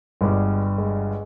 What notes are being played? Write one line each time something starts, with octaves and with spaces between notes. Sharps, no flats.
G1 G2 G3 G#3
G#3